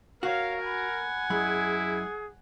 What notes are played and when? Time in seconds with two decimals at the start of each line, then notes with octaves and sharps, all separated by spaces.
0.23 F#4 A#4 C#5 F5
0.64 F#5 G#5 B5
1.30 F#2 G#3 E4 G#4 B5